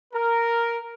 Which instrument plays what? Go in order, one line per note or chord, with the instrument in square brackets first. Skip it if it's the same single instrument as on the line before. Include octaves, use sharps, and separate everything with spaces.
[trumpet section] A#4